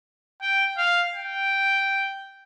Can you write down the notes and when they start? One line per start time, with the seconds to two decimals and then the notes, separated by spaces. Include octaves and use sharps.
0.42 G5
0.78 F5
1.13 G5